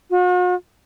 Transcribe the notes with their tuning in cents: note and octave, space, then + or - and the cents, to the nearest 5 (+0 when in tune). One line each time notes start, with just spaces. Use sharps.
F#4 -45